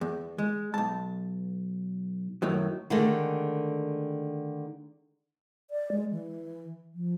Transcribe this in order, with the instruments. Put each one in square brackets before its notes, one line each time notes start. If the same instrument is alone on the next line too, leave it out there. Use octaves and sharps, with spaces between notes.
[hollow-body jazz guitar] E2
G#3
B1 A5
F#2 A2 D#3 F#3
[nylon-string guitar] D3 D#3 G#3 A3
[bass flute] D5
G#3
E3
F3